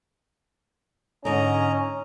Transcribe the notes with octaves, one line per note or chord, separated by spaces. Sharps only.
G#2 D3 C#4 D#5 A#5